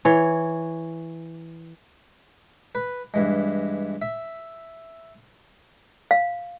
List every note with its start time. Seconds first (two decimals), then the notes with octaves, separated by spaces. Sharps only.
0.05 E3 C#5
2.75 B4
3.14 G2 E3 G#3
4.02 E5
6.11 F5